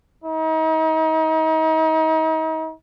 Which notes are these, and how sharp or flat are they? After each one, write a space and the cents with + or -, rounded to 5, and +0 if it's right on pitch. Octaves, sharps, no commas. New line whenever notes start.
D#4 +35